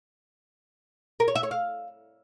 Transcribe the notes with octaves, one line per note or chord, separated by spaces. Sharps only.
A#4
C#5
E5
C#5
F5